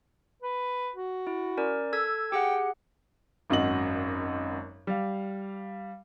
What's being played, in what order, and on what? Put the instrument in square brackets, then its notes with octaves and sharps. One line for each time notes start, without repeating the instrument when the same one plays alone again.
[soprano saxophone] B4
F#4
[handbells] E4
C#4 A#4 D5
A4 E6 G#6
[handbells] G4 G#4 F#5 [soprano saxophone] G5
[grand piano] G#1 F#2 F#4 D#5 F#7
G3 F5